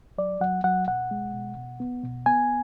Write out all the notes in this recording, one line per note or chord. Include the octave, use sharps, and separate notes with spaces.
F#3 D5
F#3 F#5
F#3 F#5
B2 F#5
G#3
B2
B2
B3
B2
B3 G#5